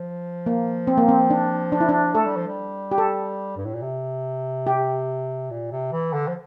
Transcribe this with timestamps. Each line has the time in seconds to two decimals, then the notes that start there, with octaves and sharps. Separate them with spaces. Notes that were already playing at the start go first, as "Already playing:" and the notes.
Already playing: F3
0.46 A#3
0.87 C4
0.98 A#3
1.08 C4
1.30 D4
1.72 D4
1.80 E4
1.89 D4
2.14 A3 A4
2.25 G3
2.36 F3
2.48 G3
2.92 G4
2.98 A4
3.57 G2
3.65 A2
3.74 A#2
3.82 C3
4.67 G4
5.50 A#2
5.72 C3
5.92 E3
6.13 D3
6.27 F3